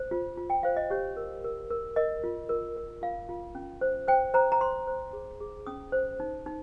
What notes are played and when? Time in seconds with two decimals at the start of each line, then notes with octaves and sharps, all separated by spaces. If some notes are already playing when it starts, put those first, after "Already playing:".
Already playing: C5
0.11 F4
0.37 F4
0.50 G5
0.63 C5 F5
0.77 D#5
0.90 G4 C#5
1.17 A#4
1.44 A#4
1.70 A#4
1.96 A#4 D#5
2.24 F4
2.49 A#4
2.76 A#4
3.02 F4 F5
3.29 F4
3.55 C#4
3.81 C5
4.08 C5 G5
4.34 C5 A#5
4.52 A#5
4.61 C5 C6
4.87 C5
5.13 G#4
5.40 G#4
5.67 C#4 D#6
5.92 C5
6.20 D#4
6.46 D#4